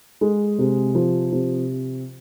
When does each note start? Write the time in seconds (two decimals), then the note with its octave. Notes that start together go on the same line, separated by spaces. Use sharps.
0.21 G#3
0.58 C3
0.95 F3
1.32 C3